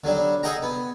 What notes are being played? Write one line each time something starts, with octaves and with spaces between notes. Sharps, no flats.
D3 F#3 G3 D4
G#4 A4 D#5 F#5 G5 A#5
B3